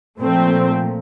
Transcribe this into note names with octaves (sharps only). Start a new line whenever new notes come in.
A#2 F3 A3 C4